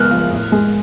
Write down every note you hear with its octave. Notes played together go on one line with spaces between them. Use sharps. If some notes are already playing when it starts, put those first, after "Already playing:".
Already playing: C#3 G#3 B3 F6 F#6
F3
A2
G#3